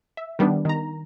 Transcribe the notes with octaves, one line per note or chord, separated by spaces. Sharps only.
E5
D#3 G3 B3 D4
D#3 A#5